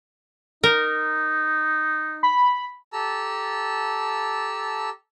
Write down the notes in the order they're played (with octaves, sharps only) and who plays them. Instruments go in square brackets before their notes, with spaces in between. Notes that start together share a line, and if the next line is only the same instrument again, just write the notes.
[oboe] D#4 [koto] A#4
[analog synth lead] B5
[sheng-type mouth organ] G4 A4 A5 A#5 E6